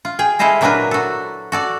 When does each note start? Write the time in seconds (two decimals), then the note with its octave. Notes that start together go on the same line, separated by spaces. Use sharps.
0.05 F4
0.19 G#4 G5
0.39 G#3 E4 A4 C5 D#5 F5
0.61 A#2 F#3 A#3 D4 A#4 B4
0.91 F#4 A4
1.52 F#4 A4 D5